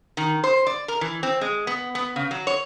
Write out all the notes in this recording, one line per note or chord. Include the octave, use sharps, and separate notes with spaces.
D#3
C5
D5
A#4
E3
C4
G#3
B3
B3
C#3
F#3
C#5